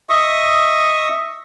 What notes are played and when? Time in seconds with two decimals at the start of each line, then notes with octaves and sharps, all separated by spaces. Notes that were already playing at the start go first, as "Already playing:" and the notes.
0.09 D#5 E5 C#6 D#6